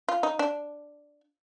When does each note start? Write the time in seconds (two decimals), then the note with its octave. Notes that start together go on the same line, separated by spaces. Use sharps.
0.08 F4
0.23 D#4
0.39 D4